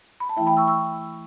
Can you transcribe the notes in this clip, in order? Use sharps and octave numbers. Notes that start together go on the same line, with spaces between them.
B5
A5
E3 A3 E4 E5 G5
G5 B5
C#6 E6
C#6 E6